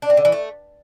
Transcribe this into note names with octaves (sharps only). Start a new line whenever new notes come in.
D4
C4
D3
E3
A3